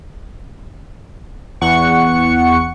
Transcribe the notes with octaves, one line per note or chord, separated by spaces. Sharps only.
E2 F#5 C#6 C#7